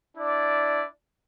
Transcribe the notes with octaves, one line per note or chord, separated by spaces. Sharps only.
D4 E4 D5